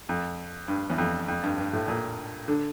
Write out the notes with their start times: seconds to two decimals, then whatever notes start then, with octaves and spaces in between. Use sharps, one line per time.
0.09 F2
0.68 G2
0.90 E2
0.98 F2
1.28 F2
1.43 G2
1.58 G2
1.73 A2
1.88 A#2
2.48 D3